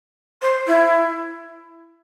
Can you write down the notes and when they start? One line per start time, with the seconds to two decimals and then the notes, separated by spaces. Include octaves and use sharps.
0.42 C5
0.67 E4